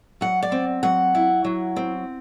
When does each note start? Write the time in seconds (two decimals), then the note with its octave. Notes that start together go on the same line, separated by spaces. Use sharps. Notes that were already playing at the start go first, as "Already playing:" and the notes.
0.21 F#3 F#5
0.42 D5
0.52 C4
0.83 F#3 F#5
1.15 E4
1.45 F#3
1.76 C4